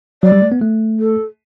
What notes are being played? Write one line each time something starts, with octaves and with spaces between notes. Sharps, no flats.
F#3 D5
G3
A3
B3
A3
A4